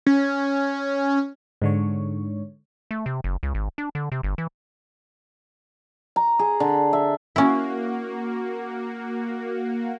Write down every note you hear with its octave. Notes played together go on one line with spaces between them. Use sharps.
C#4
G#2 D3 C#5
A3
C3
F#1
C#2
G#1
D4
D3
C3
G1
E3
A#5
G#4
D3
E5
A#3 C#4 E4 F#4